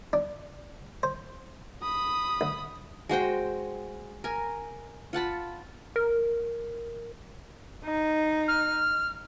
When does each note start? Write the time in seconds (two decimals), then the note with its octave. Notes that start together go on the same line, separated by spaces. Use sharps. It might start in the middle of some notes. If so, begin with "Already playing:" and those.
0.13 D4
1.03 C5
1.83 B5 D#6
2.41 D2
3.09 G#3 F#4 C5 G5
4.24 A#4 G#5
5.13 F4 F#5 A5 B5
5.96 A#4
7.85 D#4
8.48 F6